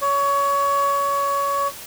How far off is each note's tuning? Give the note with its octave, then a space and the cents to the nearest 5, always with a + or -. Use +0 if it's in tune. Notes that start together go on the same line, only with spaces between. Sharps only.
C#5 +20